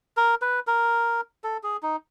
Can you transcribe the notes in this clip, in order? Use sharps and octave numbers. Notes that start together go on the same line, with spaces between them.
A#4
B4
A#4
A4
G#4
D#4